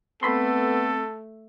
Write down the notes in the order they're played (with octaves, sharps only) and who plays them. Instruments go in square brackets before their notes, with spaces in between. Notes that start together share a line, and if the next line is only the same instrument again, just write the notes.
[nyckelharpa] A3 [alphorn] B3 [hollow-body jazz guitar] C4 B5 C6 [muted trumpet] A4